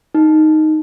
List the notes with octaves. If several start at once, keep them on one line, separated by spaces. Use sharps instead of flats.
D#4